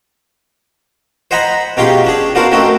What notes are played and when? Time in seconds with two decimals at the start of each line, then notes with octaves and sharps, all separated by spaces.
1.31 C5 D#5 F#5 G#5 A#5 B5
1.77 B2 C#4 D#4 F4 G4 G#4
2.04 C#4 D4 G#4
2.35 B3 D4 F4 F#4 A#4 C5
2.52 A3 C4 C#4 D#4 F#4